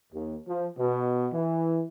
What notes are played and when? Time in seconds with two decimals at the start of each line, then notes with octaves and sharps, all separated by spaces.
0.13 D#2
0.48 F3
0.79 B2
1.33 E3